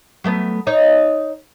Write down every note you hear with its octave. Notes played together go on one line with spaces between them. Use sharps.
F#3 A3 B3
D#4 C#5 D#5